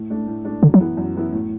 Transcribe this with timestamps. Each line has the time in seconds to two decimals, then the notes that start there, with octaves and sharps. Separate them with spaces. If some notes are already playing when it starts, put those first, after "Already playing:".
Already playing: A2
0.10 A3 D4
0.27 A2
0.45 A3 D4
0.62 F#2 D3
0.74 F#3
0.80 E3 B3 E4
0.97 F#2
1.15 E3 B3 E4
1.33 A2